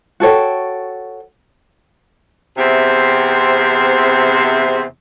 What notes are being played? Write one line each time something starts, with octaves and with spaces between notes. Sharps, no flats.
F#4 A4 C#5 G5
E2 C3 C4 C5 E5